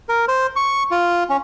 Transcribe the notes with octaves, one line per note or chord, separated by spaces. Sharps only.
A#4
C5
C#6
F4
C#4